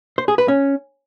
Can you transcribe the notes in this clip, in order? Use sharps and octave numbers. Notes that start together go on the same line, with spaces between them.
C5
G#4
B4
C#4